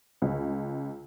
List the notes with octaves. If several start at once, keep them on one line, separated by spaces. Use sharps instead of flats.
C#2